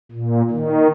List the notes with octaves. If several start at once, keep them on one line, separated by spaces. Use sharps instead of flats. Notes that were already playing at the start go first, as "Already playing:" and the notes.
A#2
D#3